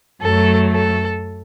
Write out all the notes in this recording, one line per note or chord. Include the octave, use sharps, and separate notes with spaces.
F#2 F#3 A3 A4
A4